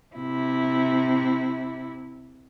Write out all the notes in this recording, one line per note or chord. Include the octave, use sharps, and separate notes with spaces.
C3 E4